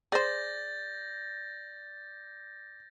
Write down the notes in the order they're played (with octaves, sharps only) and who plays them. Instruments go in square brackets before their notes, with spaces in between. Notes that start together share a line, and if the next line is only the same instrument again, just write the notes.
[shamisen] G#4 C5 [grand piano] D5 [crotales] G6 A6 A#6